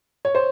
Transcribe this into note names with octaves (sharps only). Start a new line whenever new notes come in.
C#5
C5